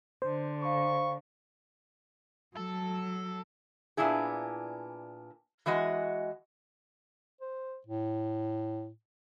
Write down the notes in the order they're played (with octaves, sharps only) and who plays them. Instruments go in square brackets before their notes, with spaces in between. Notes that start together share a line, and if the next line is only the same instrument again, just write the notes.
[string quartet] D3 [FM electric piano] C5
[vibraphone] F5 B5 [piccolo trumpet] C#6
[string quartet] F#3 [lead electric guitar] A4
[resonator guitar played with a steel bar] A#2 B3 D4 E4 G#4
E3 G#3 F#4 D#5
[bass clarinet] C5
A2